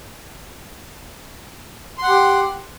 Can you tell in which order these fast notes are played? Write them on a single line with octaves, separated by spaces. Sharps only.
C6 F#5 G4